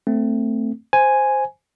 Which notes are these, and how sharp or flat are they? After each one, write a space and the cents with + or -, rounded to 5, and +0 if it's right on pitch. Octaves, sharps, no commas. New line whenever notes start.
A3 +15 C4 -10
C5 +0 G#5 +0